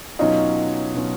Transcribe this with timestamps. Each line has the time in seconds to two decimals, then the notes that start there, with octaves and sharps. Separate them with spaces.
0.19 B2 F#3 C#4 D#4 F4
0.94 B2 F#3 C#4 F4